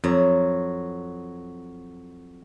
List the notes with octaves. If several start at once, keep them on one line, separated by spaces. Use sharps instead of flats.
F2 F#3